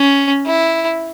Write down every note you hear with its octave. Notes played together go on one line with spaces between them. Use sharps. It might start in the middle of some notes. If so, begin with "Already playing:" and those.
Already playing: C#4
E4